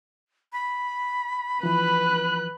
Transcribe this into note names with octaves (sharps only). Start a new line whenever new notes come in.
B5
E3 F3 B4 F#6